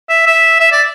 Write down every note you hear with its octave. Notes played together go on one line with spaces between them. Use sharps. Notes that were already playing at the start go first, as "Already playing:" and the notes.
E5
E5
E5
D5